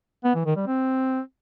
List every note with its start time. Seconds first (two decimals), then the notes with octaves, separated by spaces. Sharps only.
0.24 B3
0.35 E3
0.46 D#3
0.56 G3
0.67 C4